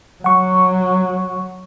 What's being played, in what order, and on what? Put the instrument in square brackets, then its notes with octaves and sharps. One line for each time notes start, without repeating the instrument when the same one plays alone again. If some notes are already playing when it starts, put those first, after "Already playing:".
[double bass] F#3 [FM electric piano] F#5 C#6